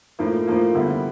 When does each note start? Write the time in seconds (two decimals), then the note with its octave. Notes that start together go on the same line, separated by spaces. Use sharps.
0.19 A2 F3 A#3
0.47 A2 F3 A#3
0.75 D3 G3 B3 E4